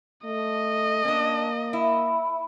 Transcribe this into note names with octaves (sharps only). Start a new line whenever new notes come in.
A3 D#5
A#3 C#4 D4
E4